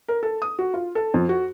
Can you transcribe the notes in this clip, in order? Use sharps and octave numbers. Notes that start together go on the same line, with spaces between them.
A#4
A4
D#6
F#4
F4
A4
F2
F#4